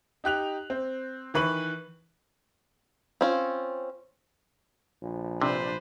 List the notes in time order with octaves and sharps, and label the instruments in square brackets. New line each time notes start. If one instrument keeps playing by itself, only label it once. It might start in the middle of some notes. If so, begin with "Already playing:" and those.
[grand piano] D#4 G4 F#6 F7
C4
D#3 E3 B4 C#6 F#7
[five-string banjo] C4 C#4 F4
[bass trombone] A#1
[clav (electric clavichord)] C3 [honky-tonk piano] D4 [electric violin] B4 C5